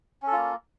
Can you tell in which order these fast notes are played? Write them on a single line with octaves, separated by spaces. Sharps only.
C#4 A4 F4 A#3